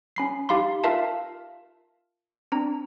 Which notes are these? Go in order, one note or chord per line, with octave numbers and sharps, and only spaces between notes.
C#4 B5 C7
D#4 G4 F5 B5 C6
F4 A#4 E5 F5 A5
C4 D4 A#5